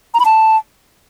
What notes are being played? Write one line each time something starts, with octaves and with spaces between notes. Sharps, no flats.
A#5
B5
A5